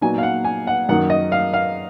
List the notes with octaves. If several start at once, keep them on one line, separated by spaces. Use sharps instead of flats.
A#2 F#3 B3 D#4 G#5
F5
F#5
G#5
F#5
F#2 D#3 F#3 A#3 F#5
D#5
F5
F5